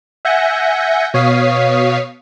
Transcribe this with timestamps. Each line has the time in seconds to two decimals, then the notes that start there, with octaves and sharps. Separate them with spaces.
0.25 E5 F#5 G#5 G6 A#6 C#7
1.14 B2 C#5 F5 D#6 B6 C7